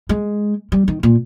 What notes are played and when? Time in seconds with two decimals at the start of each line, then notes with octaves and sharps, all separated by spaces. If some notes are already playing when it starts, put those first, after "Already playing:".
0.09 G#3
0.72 G3
0.88 D#3
1.03 A#2